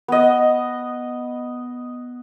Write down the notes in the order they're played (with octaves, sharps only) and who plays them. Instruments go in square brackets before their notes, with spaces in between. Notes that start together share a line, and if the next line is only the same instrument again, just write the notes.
[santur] B3 D#5